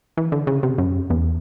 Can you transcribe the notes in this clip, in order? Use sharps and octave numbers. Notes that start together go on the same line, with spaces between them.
E3
D3
C#3
C3
F#2
E2